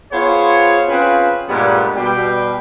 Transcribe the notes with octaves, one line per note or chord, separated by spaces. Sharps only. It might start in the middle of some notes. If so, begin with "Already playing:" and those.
B3 F4 G#4 C5 C#5
C4 C#4 F4 G#4 B4
G2 A#2 G3 G#3 B3
B2 G3 G5